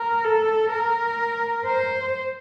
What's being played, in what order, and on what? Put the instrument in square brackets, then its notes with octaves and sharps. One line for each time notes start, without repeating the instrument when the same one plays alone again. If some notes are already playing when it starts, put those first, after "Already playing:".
Already playing: [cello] A#4
A4
A#4
C5